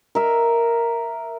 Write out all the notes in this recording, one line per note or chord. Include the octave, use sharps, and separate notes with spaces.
A#4 E5